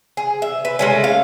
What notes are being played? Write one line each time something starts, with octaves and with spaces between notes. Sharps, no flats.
G#4
E5
B4
G#3 A3 C#4
F5